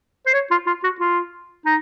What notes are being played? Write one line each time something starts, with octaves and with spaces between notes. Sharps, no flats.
C5
C#5
F4
F4
F#4
F4
D#4